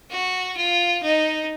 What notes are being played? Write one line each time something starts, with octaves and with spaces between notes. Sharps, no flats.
F#4
F4
D#4